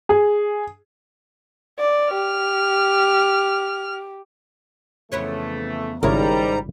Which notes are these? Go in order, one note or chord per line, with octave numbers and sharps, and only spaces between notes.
G#4
D5
G4 F6
F2 C#3 E3 A3 B3 C#5
G#1 G#2 C#3 G3 E4 A#4 C#5 A#5